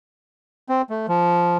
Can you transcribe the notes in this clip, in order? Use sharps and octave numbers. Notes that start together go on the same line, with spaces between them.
C4
A3
F3